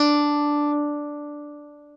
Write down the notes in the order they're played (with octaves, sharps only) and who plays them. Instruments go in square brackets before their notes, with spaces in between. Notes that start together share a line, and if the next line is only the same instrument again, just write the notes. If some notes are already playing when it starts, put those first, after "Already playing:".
Already playing: [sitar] D4